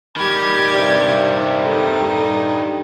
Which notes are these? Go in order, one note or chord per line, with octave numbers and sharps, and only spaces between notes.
D#3 G3 G4 B5 G#6
G2 C3 D5
D#4 A4
G2